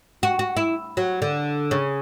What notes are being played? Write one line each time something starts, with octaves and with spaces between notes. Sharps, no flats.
F#4
F#4
E4
F#3
D3
C#3